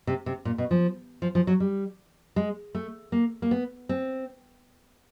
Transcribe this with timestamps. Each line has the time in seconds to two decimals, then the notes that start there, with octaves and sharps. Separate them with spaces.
0.07 C3
0.26 C3
0.45 A#2
0.58 B2
0.71 F3
1.22 F3
1.35 F3
1.47 F#3
1.60 G3
2.36 G#3
2.75 A3
3.12 A#3
3.42 A#3
3.51 B3
3.89 C4